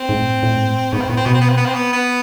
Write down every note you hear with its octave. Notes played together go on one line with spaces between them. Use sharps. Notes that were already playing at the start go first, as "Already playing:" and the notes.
Already playing: C4
G#2
A2
A2
G#2
A2
G#2 B3
C4
A2 B3
C4
B2 B3
C4
B3
C4
B3
C4
B3
B3